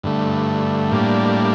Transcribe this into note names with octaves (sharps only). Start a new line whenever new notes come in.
G2 D3 A3
A2 G3 A#3 D4